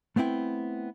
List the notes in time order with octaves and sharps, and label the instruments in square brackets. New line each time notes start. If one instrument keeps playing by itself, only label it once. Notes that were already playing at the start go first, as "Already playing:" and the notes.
[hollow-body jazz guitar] A3 B3 C4 E4 G5